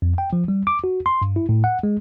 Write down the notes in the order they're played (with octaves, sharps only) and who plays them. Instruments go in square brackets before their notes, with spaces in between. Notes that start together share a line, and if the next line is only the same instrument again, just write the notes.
[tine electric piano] F2
G5
F3
G3
D6
F#4
C6
G2
E4
A2
F#5
G#3